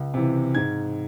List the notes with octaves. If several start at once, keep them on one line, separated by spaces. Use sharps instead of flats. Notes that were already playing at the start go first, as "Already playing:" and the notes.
Already playing: C#2
C3 E3
G#2 G#6